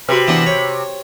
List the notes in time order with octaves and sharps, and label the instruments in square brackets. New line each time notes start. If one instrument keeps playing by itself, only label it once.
[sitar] C3 [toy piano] F#4 B4 [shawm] B5
[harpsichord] E3 B3 D4
C#5